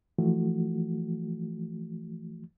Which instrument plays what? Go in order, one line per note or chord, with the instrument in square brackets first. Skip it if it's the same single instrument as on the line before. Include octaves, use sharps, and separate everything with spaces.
[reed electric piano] E3 F3 A3 F#4